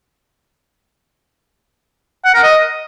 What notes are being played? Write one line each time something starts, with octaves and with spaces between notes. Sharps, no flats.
F#5
A#4
D#5